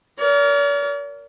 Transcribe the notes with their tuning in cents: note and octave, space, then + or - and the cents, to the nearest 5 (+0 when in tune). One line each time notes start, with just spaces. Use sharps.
A#4 +0 D5 -45